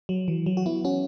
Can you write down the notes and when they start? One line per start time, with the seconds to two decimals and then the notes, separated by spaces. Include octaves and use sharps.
0.09 F#3
0.28 E3
0.46 F#3
0.57 F#4
0.66 B3 E4
0.85 C#4 F#4